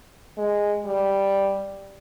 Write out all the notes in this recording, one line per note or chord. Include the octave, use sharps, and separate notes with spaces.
G#3
G3